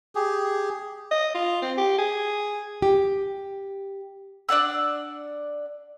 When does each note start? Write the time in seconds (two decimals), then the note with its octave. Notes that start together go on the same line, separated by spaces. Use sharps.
0.15 G4 G#4
1.11 D#5
1.35 F4
1.62 C4
1.78 G4
1.98 G#4
2.82 G4
4.49 D4 D5 F#5 E6